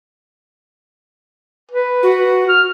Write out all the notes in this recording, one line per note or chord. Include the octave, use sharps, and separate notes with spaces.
B4
F#4
F6